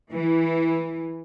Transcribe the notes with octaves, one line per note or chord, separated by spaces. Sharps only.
E3